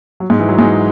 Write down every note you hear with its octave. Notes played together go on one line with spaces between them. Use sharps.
F#3
G#2 G#3
E3
F#3
G#2 G#3